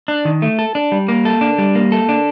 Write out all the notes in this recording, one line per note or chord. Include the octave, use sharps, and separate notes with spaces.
D4
D#3
A3
A4
D4
G3
A#3
A4
D4
G3
A#3
A4
D4